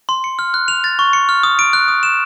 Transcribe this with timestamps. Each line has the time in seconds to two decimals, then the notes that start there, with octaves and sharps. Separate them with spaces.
0.09 C6
0.24 C#7
0.39 F6
0.54 F#6
0.68 F7
0.84 A6
0.99 C#6
1.13 C#7
1.29 F6
1.43 D#6
1.59 D7
1.73 F#6
1.88 D#6
2.03 E7